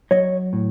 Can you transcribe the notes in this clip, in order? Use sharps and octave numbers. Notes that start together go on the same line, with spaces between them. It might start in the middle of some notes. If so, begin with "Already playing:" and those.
F#3 C#5 D#5
A2